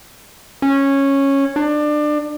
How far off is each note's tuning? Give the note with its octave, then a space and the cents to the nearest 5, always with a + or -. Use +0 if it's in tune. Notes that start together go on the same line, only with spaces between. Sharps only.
C#4 -10
D4 +25